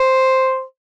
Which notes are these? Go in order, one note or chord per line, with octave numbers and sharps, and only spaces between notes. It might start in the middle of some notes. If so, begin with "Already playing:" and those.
Already playing: C5